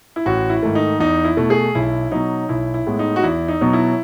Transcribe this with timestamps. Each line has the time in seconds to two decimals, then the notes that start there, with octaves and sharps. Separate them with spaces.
0.16 E4
0.26 A1 F#4
0.50 E4
0.63 G#2 D#3 A3
0.75 D#4
0.99 E2 D#4
1.25 E4
1.37 B2 A3
1.50 G#4
1.75 B1 E4
2.11 B2 F#3 D#4
2.49 B1 E4
2.74 E4
2.87 A2 G#3 B3
2.99 D#4
3.16 F#4
3.23 E2 E4
3.48 D#4
3.61 B2 F#3 B3
3.73 E4